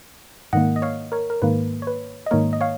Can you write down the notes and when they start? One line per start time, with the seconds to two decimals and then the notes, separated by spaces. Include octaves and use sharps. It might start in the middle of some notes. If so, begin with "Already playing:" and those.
0.53 G#2 D#3 A#3 D#5 F#5
0.76 D#5
0.82 C#5 F5
1.12 A#4 C#5
1.30 A#4
1.42 G#2 D#3 A#3 B4
1.82 C#5
1.87 B4
2.26 D#5
2.31 G#2 D#3 A#3 A#4 C#5
2.53 D#5
2.61 C#5 F5